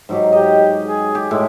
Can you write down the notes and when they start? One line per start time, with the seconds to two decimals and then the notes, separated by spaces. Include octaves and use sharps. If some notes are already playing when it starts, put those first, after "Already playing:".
0.09 G#2 F#3 G4
0.32 G4 D#5
0.86 G#4
1.15 G4
1.31 A2 G#3